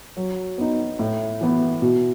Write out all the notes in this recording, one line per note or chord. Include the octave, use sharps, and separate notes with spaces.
F#3
B3 D#4
A2
E3 B3 E4
B2